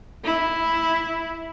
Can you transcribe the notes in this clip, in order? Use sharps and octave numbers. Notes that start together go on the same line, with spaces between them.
E4